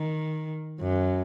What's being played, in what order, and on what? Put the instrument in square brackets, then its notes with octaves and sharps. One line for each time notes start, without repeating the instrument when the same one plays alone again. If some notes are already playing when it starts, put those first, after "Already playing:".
Already playing: [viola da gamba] D#3
F#2